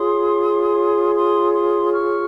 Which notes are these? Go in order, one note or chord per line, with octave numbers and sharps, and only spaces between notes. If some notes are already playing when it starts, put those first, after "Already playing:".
Already playing: F4 G#4 C#5 C6 D#6
C6 D#6
C6 D#6
D#6
C#6 F6